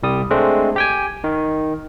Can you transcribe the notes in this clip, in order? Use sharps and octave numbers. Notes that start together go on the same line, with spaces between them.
C2 G3 D#6
G#3 A3 C4 D4
G4 G5 G#5
D#3